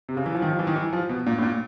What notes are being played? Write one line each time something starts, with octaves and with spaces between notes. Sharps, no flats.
C3
C#3
E3
F3
D#3
F3
E3
D#3
E3
F3
B2
A#2
A2
A#2